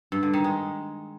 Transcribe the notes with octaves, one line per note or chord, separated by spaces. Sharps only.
G2
D3
D#3
G#3